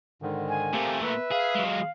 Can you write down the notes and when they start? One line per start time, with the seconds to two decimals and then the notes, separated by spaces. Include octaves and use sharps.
0.22 G#2 D3 D#3
0.49 G#5
0.73 A#2 A3 A#3 C4 G4
1.03 B4 E5 E6
1.31 G#4 F5
1.55 F#3 G#3